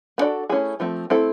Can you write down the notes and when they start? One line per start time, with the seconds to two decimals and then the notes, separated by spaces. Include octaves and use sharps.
0.18 B3 D4 F#4 A4 D5
0.49 A3 C#4 E4 G#4
0.80 F3 A3 C4
1.10 A3 C4 E4 A4